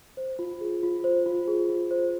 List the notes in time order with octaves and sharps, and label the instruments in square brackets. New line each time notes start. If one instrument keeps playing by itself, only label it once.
[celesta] C5
F4
G#4
F4
C5
F4
G#4
F4
C5